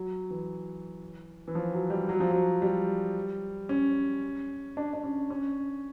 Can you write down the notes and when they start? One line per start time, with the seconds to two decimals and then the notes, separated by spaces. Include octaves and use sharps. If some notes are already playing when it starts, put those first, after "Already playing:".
Already playing: F#3
0.30 E3
1.48 E3
1.55 F3
1.73 F#3
1.90 G3
2.09 F#3
2.20 F3
2.30 F#3
2.62 G3
3.69 C#4
4.77 D4
4.94 D4
5.04 C#4
5.30 C#4